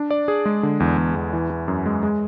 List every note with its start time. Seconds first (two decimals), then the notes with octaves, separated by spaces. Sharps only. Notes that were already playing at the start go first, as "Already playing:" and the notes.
Already playing: D4
0.11 D5
0.28 G#4
0.46 G#3
0.63 D3
0.80 E2
0.98 E2
1.16 E2
1.33 E3
1.50 E3
1.68 F#2
1.86 G#3
2.03 G#3